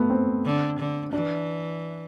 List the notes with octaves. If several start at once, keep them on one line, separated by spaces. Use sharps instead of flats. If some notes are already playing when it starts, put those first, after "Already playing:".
Already playing: A3 B3
C4
D3
D3
E3 D4